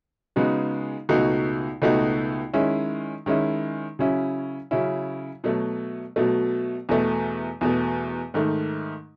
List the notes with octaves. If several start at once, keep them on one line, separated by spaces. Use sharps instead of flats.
C#3 G#3 B3 D#4 F#4
C#2 B2 A3 D#4 F#4
C#2 B2 A3 D#4 F#4
D#3 G#3 C#4 E4
D#3 G#3 C#4 E4
C#3 F#3 C#4 E4
C#3 F#3 C#4 E4
B2 F#3 A3
B2 F#3 A3
E2 B2 A3
E2 B2 A3
G#2 D#3 A3